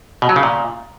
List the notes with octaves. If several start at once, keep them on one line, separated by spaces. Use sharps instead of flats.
B2
F#3
C#3
A#2